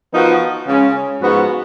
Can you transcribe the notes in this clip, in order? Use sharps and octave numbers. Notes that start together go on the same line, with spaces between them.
F3 B3 D#4 F#4 A#4
C#3 G#3 C#4
G#2 F3 B3 F#4